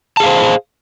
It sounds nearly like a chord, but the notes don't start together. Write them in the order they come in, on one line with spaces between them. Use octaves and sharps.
A5 G#4 F5 C5